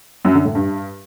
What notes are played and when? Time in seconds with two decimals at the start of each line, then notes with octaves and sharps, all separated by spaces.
0.25 F#2
0.35 D3
0.45 A2
0.55 G2